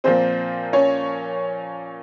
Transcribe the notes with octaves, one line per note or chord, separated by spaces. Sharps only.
A#2 F3 A#3 C4 C5
C#4 C#5